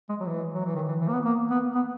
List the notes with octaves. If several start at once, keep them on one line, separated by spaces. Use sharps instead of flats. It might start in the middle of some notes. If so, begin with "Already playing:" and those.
G#3
F#3
E3
F#3
E3
D#3
E3
E3
A#3
B3
A#3
B3
B3